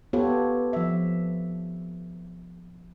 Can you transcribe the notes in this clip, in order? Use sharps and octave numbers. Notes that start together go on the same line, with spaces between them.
B3 F4 G4 A4 B4 C#5
F3 E5